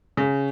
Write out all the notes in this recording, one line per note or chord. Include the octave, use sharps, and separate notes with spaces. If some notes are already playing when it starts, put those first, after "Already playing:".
C#3